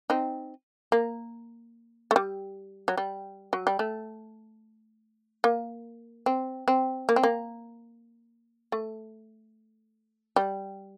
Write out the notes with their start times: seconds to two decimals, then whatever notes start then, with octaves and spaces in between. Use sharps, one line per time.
0.10 C4 D#4
0.92 A#3
2.11 A3
2.16 G3
2.88 F#3
2.97 G3
3.53 F#3
3.67 G3
3.79 A3
5.44 A#3
6.26 C4
6.68 C4
7.09 A#3
7.16 C4
7.23 A#3
8.72 A3
10.36 G3